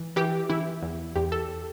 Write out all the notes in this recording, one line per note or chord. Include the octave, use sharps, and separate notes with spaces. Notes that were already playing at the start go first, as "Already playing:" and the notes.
Already playing: E3
E3 G4
E3 E4
E2
E2 G4
A4